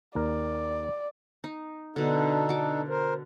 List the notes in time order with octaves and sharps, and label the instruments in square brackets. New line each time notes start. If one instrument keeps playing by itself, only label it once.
[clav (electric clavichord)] D#2 A#4 [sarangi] D5
[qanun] D#4
[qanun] B2 D3 [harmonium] D4 D#4 A4
[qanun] F#4 D6
[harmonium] A#4 C5